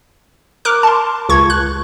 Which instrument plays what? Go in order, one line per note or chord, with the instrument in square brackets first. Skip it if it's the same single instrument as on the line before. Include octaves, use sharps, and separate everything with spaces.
[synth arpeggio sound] A#4 D6 F#6
A5 C6
C#2 C#6 G#6
F#6